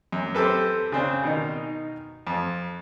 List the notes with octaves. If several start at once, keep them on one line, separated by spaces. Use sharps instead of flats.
F#2
C4 G4 A4 B4
C#3 C4 D4
B2 D#3 D#4
F2